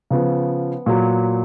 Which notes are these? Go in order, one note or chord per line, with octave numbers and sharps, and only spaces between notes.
C#3 F3 B3
A#2 F#3